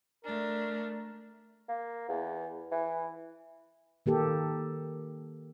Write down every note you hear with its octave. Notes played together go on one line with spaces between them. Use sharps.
A3 D4 A#4
A#3
E2
E3
D#3 A#3 G4 A4